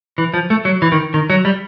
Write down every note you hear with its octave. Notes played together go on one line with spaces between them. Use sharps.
E3
F3
A3
F#3
E3
D#3
D#3
F#3
G3